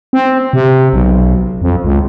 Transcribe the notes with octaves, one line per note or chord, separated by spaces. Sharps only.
C4
C3
B1
F2
C#2